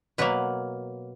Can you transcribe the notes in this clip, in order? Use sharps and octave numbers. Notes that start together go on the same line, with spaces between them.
B2 F#3 A#3 B4